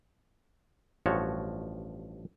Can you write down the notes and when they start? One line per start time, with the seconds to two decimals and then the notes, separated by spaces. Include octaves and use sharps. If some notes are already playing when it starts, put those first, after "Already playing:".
1.06 A1 G2 F3 F#4 C#5